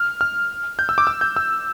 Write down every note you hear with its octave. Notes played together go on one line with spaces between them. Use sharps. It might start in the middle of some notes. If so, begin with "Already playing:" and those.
Already playing: F6
F6
G6
E6
D6
E6
G6
E6